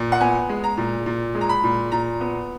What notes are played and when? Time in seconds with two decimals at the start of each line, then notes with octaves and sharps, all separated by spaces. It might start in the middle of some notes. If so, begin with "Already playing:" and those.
Already playing: A#2
0.12 F#5
0.21 B3 G#5
0.49 G#3
0.64 A#5
0.77 A#2
1.06 A#2
1.35 G#3
1.41 A#5
1.49 B5
1.64 A#2
1.92 A#2 A#5
2.21 B3